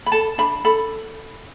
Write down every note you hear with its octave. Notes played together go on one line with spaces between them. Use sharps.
B5
A4 A5
D4 B5
A4 B5